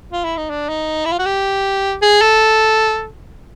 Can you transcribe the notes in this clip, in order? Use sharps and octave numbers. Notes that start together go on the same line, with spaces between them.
F4
E4
D#4
D4
D#4
E4
F4
F#4
G4
G#4
A4